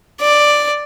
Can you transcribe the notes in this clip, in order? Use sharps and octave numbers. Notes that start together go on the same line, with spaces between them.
D5